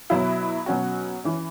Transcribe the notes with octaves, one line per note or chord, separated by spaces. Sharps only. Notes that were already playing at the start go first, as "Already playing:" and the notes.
B2 F#3 E4
B2 F#3 C#4 F#4
E3 C#4